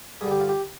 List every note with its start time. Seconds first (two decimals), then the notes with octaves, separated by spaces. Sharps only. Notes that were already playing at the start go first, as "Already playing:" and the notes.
0.21 G2 D3 G3 G#4
0.31 G4
0.40 F4
0.49 G4